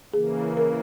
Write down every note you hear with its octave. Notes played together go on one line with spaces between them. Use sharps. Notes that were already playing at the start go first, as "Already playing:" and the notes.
C#3 E3 A#3 G#4
A#4